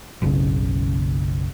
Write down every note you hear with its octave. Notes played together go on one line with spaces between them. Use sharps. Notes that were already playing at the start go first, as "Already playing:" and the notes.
F#1 B1 C#3